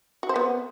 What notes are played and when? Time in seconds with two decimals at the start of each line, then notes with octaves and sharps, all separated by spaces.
0.23 F#4
0.29 C5
0.36 B3